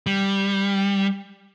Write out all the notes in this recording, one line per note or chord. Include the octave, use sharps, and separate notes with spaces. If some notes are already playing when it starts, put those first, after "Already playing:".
G3